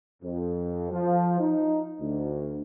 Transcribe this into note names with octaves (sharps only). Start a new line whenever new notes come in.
F2
F3
D#4
D2